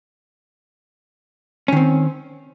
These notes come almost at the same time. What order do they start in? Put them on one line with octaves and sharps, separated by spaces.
C#4 D#3 C4